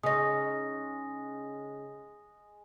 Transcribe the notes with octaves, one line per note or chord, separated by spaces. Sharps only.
C#3 G#3 D#4 D#6 A#6